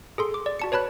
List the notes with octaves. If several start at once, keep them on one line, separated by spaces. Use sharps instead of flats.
G#4 A4 C6
D6
D5
F#4 A5 C#7
B4 C#5 A5 B5 F#6